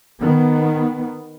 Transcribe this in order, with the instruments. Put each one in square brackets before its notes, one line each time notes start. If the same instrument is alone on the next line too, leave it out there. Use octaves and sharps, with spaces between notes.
[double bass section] D#3 B3